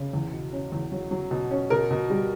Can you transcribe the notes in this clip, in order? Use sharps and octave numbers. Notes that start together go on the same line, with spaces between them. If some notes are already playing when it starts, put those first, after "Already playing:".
Already playing: C#3
E2
B2
C#4
E2
F#3
F#3
B2
C#4
B2 A#4
B2
G3